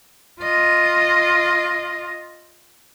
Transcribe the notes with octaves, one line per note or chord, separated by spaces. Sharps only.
F4 D#5